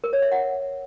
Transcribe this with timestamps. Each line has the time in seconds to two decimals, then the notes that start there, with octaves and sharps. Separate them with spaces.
0.04 A#4
0.13 C#5
0.22 E5
0.32 F#5